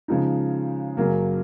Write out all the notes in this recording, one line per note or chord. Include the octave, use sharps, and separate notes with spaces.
C#3 F3 G#3 D#4
F#2 C#3 F#3 A#3